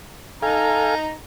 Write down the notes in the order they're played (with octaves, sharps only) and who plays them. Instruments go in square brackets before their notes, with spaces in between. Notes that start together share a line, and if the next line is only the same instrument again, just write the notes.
[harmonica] D#4 A#5 [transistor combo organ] A4 F5 G#5